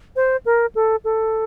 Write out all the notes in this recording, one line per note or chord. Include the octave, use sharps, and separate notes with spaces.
C5
A#4
A4
A4